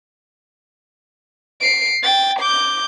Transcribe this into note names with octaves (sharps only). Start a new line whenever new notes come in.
C7 D7
G5 A6
D6 G6